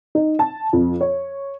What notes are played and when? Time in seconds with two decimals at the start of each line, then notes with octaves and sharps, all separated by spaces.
0.15 D#4
0.39 A5
0.73 F2
1.01 C#5